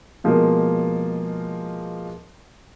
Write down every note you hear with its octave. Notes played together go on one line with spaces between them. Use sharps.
B2 F3 G#3 A#3